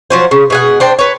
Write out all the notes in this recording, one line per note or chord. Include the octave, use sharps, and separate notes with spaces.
F3 F#3 C5
C#3
B2 G#4 F#5
D4 C5 G5
B4 C#5